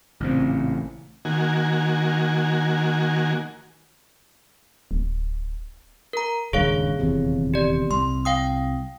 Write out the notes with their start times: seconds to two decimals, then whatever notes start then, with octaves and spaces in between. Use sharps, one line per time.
0.20 A1 A#2 C#3 C4
1.25 D#3 A#3 F#4 G#5
4.91 D1
6.13 A#4 A#5
6.53 D#1 C#2 G2 G#4 C#5 F5
6.99 D#1 E2 C3
7.54 G4 D5
7.91 C2 C6
8.25 F5 G5 D#6